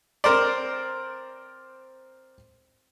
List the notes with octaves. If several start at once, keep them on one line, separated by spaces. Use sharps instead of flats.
C4 A#4 C5 D5